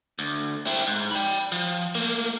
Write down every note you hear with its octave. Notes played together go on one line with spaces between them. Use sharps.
D2
C4 E4
G#2
G5 B5
F3
A3 A#3